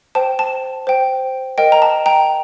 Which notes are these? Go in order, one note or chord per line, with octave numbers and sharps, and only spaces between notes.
C5 G5 A5
A5
C5 G5
A#4 D#5 G5
A#5
A5
G5 A#5